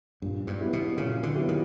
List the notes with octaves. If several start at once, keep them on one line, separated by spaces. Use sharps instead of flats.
G2 A#2
G2
F#3 B3 E4 G4
B2
A#2 C#3
D3
F#3 B3 E4 G4
D#3